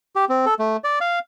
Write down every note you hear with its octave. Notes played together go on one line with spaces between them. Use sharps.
G4
C4
A4
A3
D5
F5